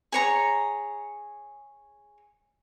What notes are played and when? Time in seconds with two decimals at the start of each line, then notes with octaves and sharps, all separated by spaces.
0.12 G#4 C#5 A#5